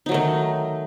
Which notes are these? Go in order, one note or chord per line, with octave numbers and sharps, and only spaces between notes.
D#3 F#3 A3 D#4